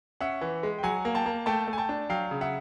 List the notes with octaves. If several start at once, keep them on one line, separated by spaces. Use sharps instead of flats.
C#4 E5 F#5
E3
G#3
G5
F#3 F#5 G#5
A#3
G5 A5
A#3
A3 G5 A5
A3
G#5
G5 A5
D4
F#3 F5 G5
C#3
E5 F#5